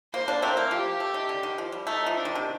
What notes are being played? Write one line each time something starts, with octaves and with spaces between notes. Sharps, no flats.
A#3 C5
A#3 D4
A3 C4 A#4
A#3
F3 G4
A3
D#3
D3
D#3
F3
G3
A3 D#4
F3
D4
D#3
C3